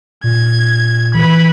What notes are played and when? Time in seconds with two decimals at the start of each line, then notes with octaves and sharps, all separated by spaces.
0.24 A#2 G#6
1.15 E3 B4 B5